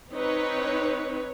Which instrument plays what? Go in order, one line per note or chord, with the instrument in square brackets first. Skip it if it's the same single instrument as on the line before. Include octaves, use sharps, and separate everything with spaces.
[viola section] C4 D#4 B4 C#5